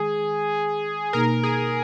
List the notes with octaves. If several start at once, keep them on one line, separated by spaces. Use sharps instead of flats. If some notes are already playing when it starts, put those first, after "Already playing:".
Already playing: D#3 G#3 G#4
B2 A#3 D#4 A#4
G#4